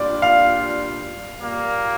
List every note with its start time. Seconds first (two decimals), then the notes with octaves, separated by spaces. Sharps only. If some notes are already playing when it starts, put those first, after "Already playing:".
Already playing: A#2 G3 D4 F4 D5
0.22 F5
1.39 A#2 G3 A#3